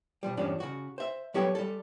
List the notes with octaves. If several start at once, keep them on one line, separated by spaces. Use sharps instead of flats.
B2 F3 G3
E2 G2 F3 C#4 D4
C#3 F#4
C5 E5
F#3 G3 B3 G4 A4 C#5
G3 A4